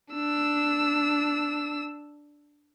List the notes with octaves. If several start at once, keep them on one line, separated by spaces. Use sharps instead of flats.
D4 E6